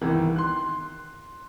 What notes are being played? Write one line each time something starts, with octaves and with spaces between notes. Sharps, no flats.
C2 D#3 E3
C6 F#6